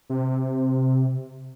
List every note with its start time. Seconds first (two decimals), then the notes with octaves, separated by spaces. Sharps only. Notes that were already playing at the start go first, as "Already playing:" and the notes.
0.10 C3